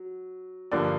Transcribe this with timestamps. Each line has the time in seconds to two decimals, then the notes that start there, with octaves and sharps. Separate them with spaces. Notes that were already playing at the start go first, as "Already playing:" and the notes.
Already playing: F#3
0.71 G2 D3 F3 A#3 D5